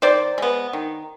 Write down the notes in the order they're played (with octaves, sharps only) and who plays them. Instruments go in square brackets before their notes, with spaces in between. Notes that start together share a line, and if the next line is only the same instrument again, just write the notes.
[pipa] D#3 C5 D5
G#3 B3
D#3